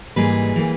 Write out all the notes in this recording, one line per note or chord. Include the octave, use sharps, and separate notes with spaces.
G#2 E3 G3 A#3 G#4 B4
E3 G3 A#3